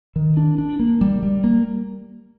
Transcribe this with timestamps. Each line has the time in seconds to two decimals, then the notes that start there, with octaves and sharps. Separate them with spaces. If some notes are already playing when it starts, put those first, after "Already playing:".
0.16 D#3
0.37 D4
0.58 D4
0.79 A#3
1.01 G3
1.23 G3
1.44 A#3